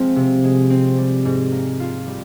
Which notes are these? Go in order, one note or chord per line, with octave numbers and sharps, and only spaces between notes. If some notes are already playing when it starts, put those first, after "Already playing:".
Already playing: F3 G#3 C4
C3
G#3
C4
G3
G#2
A#3
F4
G3